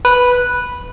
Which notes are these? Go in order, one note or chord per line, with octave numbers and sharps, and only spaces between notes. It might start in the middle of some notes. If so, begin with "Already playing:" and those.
B4